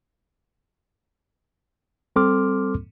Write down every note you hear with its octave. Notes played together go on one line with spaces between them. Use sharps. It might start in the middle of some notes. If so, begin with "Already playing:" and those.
G3 C4 A4 C6 D6 F6